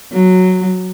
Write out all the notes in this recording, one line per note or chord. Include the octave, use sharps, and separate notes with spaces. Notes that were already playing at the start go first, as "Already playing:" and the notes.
F#3